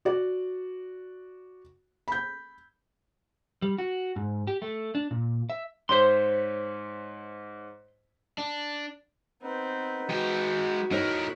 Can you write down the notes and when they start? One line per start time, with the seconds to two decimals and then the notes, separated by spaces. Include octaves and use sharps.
0.05 F#4 D5
2.08 B5 G6
3.62 G3
3.78 F#4
4.16 G#2
4.47 G4
4.62 A3
4.95 D4
5.11 A#2
5.50 E5
5.89 G#2 C5 C#5 C6 B6
8.38 D4
9.42 B3 C4 D#4 B4
10.10 G#3 F#4 G5
10.91 A2 D#4 A#4 C#5 B5 F#6 G6